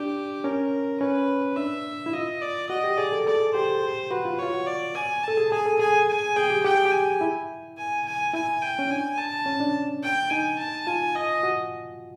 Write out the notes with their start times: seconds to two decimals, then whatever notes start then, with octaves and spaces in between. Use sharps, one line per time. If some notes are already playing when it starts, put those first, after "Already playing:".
Already playing: D4 G4
0.44 C#4 A#4
1.01 C#4 B4
1.56 D4 E5
2.06 E4
2.13 F4 D#5
2.42 D5
2.70 F#4 D#5
2.84 G4
2.98 G#4 D5
3.12 A4
3.26 A4 D5
3.40 G#4
3.54 G4 C5
4.11 F#4 B4
4.25 F4
4.39 F4 C#5
4.53 F#4
4.67 D5
4.95 G#5
5.24 A4 A5
5.37 G#4
5.52 G#4 G#5
5.66 A4
5.80 G#4 G#5
6.08 G#5
6.36 G#4 G5
6.50 G4
6.64 G4 G5
6.75 G#4
6.85 G4
6.92 G#5
7.21 E4
7.78 G#5
8.06 G#5
8.33 E4 G#5
8.62 G5
8.79 C#4
8.90 D4 G#5
9.18 A5
9.46 C#4
9.60 D4
10.03 G5
10.31 D#4 G#5
10.59 A5
10.87 F4 G#5
11.15 D#5
11.43 F#4